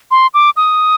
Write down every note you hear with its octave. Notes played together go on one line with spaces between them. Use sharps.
C6
D6
D#6